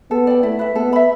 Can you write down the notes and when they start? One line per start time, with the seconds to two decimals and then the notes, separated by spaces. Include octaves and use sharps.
0.11 B3 A4
0.27 D5 G5
0.43 A3 E4
0.59 B4 E5
0.75 B3 A4
0.93 E5 B5